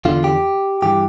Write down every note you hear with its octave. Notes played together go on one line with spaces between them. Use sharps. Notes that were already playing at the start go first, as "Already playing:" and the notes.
E2 D3 F4
G4
G2 E3 G4